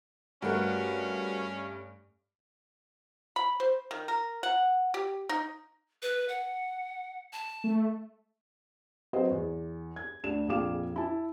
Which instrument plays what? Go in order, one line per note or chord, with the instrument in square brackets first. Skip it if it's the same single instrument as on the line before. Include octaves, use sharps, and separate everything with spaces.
[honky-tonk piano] G2 A3 [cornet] C#4 [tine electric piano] F#4 A#4 B4
[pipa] B5
C5
D#3
A#4
F#5
G4
D#4
[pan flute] B4
F#5
A5
[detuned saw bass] A3
[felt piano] F#3 C4 G#4 B4 C5 D#5
E2
G#6
D2 D4 E7
A#1 F2 G#4 F5 D6 E7
E4 A5